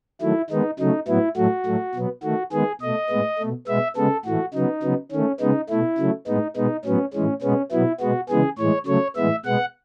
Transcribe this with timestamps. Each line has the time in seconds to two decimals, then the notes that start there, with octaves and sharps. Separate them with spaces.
0.21 D#3 F#3 A3 E4
0.50 D#3 G#3 B3 D#4
0.80 C#3 F#3 A3 D#4
1.08 A2 F#3 B3 E4
1.37 A2 F#3 A3 F#4
1.66 A2 F#3 A3
1.95 B2 F#3 B3
2.23 D#3 A3 F#4
2.52 D#3 G#3 B3 G#4
2.81 B2 A3 D#5
3.10 A2 G#3 B3
3.39 B2 A3
3.68 B2 G#3 B3 E5
3.96 C#3 G#3 B3 A4
4.25 A2 E3 A3 F#4
4.54 C#3 F#3 B3 D#4
4.83 C#3 F#3 B3
5.12 D#3 A3 C#4
5.40 C#3 G#3 B3 D#4
5.70 B2 A3 E4
5.98 C#3 F#3 A3
6.27 A2 G#3 B3 D#4
6.56 B2 G#3 B3 D#4
6.85 A2 F#3 B3 C#4
7.14 A2 E3 G#3 C#4
7.42 B2 G#3 B3 C#4
7.72 B2 F#3 B3 E4
8.01 B2 G#3 B3 F#4
8.29 C#3 E3 G#3 B3 G#4
8.58 A2 E3 G#3 C#5
8.86 C#3 F#3 A3 C#5
9.16 A2 E3 G#3 B3 E5
9.45 B2 G#3 B3 F#5